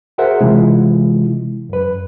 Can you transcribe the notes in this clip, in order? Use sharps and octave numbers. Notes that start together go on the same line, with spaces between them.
F#4 G#4 A#4 C5 E5 F#5
C3 E3 G#3 E4 F4
F#2 B4